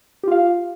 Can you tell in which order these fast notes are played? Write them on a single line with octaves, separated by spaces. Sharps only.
G4 F4 F5